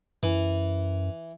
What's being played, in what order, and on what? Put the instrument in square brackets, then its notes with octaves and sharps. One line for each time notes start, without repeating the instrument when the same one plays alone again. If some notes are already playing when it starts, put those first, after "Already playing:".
[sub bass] F#2 [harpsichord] E3